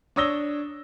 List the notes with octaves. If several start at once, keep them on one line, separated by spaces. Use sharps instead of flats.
D4 C#5 D#6 E6 A#6 G7